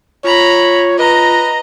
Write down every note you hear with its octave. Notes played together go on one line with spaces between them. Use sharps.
F4 C#5 A#5 B5
B4 D#5 A#5